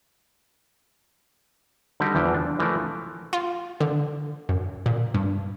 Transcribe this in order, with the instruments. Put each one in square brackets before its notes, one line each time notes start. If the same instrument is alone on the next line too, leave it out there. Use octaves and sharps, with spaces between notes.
[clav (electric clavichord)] D3 G3 D#4 F#4 G4
E2 E3 F3 G5
D4
E3 F3 A3 A#4
[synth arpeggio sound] F4
D3
F#2
A#2
G2